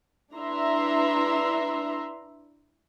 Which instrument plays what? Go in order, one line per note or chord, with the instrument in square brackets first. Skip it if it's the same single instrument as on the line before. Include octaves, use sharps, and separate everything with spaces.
[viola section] D4 E4 B4 E5 A#5 C6